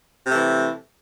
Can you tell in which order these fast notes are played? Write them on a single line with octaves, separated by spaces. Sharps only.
C3 A3 E3